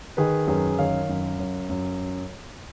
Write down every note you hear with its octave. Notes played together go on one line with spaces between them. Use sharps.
D#3 G#4 B4
F#2 G#4 B4
D#3 C#5 F5
F#2
F#2
F#2